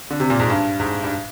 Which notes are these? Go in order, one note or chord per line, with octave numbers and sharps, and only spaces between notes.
D3
C3
A#2
G#2
G2
G#2
G2